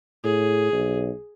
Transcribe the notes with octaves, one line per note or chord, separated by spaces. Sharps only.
A2 G#4
B1